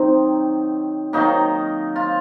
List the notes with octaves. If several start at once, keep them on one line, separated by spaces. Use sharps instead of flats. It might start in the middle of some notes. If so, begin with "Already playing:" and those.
Already playing: D#3 F#3 C4 D#4
D#3 F#3 A#3 D#4
F4